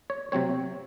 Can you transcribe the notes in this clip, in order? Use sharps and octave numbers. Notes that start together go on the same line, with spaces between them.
C#5
C3 F#3 C4 C#5